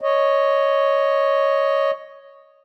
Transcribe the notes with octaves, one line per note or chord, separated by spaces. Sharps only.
C#5 D#5